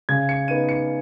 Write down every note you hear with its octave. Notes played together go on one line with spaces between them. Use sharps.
C#3 G#6
C#7
B3 D#4 D#7
C#7